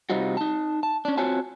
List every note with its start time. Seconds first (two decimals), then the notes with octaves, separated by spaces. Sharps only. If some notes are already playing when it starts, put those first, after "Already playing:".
0.10 C3 G3 C4 D#4 F4 F#4
0.37 D#4 A5
0.83 A5
1.05 C#4 D4
1.18 C4 F4 F#4 C#5 G#5 A5